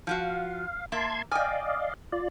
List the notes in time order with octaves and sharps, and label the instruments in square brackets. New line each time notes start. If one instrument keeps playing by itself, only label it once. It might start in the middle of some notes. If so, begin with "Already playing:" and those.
[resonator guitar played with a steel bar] F3 F4 F#4 [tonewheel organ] F5
[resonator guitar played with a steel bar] A#3 E5 [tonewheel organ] A5 C6 G#6
[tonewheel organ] D5 D#5 F5 [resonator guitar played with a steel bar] G5 G#5
[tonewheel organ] F4 D5